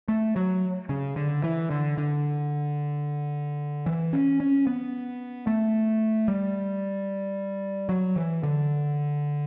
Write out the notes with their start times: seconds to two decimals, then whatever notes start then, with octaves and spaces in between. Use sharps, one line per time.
0.08 A3
0.36 F#3
0.89 C#3
1.16 D3
1.44 E3
1.71 D3
1.98 D3
3.86 E3
4.13 C#4
4.40 C#4
4.67 B3
5.47 A3
6.28 G3
7.89 F#3
8.16 E3
8.43 D3